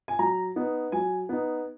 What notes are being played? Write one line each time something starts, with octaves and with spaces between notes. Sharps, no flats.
G#5
F#3 A#5
B3 D#4
F#3 G#5
B3 D#4